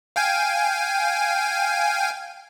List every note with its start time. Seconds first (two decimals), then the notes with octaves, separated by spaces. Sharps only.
0.16 F5 G5 G#5